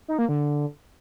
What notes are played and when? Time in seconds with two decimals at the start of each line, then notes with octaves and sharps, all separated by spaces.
0.08 D#4
0.19 A#3
0.29 D3